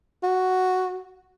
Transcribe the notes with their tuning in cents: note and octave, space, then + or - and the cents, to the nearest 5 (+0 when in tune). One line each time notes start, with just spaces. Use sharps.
F#4 +0